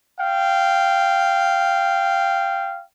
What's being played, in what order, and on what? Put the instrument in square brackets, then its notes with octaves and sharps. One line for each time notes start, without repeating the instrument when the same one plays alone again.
[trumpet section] F5 G5